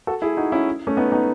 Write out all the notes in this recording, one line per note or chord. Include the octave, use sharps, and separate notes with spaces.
F#4 A4
E4 G#4
D#4 F#4
C#4 E4
A3 C#4
B3 D#4
B3 D#4